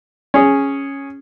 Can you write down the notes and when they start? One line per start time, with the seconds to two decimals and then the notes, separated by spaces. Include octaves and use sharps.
0.34 C#4 G#4